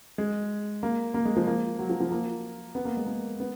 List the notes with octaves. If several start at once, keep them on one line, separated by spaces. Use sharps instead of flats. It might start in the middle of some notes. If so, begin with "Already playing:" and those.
G#3
A#3
A#3
G#3
F3
A#3
F#3
F3
F3
A#3
B3
A#3
G#3
A#3
B3